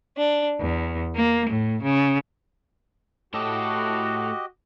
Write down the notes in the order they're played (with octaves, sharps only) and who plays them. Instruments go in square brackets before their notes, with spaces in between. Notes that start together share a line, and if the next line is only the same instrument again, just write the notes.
[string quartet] D4
E2
A#3
A2
C#3
[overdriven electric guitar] A2 A4 [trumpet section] F#4 [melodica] G4 D#5